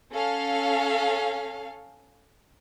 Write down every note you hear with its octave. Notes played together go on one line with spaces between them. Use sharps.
C#4 A4 F5